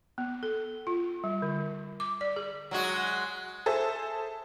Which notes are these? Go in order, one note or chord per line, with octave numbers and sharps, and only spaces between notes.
B3
A4
F4
G3
D3
D6
D5
G#4
F#3 G#3 F#4
G#4 A4 C5 E5